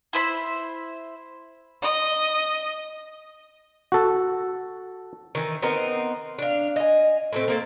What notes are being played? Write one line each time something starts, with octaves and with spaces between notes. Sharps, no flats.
E4 C5 B5
D#5
F#4 A4
D#3 E3 D#4
B3 C4 D#4 A#4
D4 F5
D#5 G#5
A2 A3 C4
A#3 C4 A4